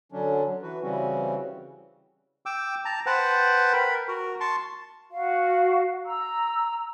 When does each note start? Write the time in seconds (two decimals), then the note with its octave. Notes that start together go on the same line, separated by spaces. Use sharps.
0.12 D3 F#3 C#4 D4
0.62 E3 F#4 B4
0.82 C#3 E3 G3 C4 C#4 F#4
2.46 G5 D6 E6
2.85 A5 A#5
3.06 B4 C5 F#5 G5 A5
3.73 A#4 B5
4.08 F#4 A#4
4.40 A5 C6 C#6
5.11 F#4 F5
6.06 A#5 E6